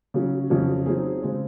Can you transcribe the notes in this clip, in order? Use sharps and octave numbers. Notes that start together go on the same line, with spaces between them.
C#3 F#3 C#4
F2 C#3 F#3
F#3 C4 D#4 G#4
C#3 G#3 C4